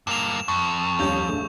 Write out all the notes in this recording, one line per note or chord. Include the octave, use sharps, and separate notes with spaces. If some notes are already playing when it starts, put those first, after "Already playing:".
G2 A#3 E7 F7
F2 C#6
D#2 G3 C#4 G6 F7
A#1 A3